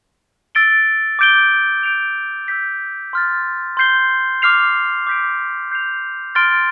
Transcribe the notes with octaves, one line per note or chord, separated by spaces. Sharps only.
E6 A6 D7 G7
D6 G6 D7 G7
G6 D7 F7
E6 G6 B6
C6 F6 A6
C6 G6 C7 G7
D6 F6 C7 F7
D6 G6 B6 D7
G6 C7 F7
C6 F6 A6 D7 G7